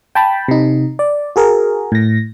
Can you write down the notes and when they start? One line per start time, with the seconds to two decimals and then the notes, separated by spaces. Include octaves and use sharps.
0.15 G5 A5 B5
0.48 C3 D#4
0.99 D5
1.36 F#4 G#4 A#4
1.92 A2 A#6